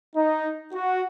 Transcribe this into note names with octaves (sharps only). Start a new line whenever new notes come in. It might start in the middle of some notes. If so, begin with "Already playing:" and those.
D#4
F#4